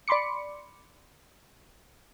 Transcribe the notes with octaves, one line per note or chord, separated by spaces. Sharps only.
D5 B5 C6 D6 C#7